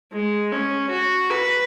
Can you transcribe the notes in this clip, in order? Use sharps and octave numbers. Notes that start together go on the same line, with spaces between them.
G#3
C#4
F#4
B4